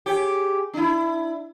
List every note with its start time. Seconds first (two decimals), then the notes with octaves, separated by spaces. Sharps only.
0.06 G4 G#4 C#5
0.74 D4 E4